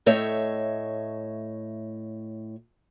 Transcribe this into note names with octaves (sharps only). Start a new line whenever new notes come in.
A2 A3 C#5 D#5 E5